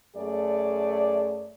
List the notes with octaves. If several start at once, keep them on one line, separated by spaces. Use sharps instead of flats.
F#2 A3 G#4 D5